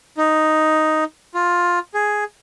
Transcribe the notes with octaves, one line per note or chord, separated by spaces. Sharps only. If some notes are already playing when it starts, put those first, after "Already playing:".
D#4
F4
G#4